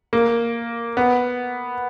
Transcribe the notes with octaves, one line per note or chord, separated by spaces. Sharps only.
A#3
B3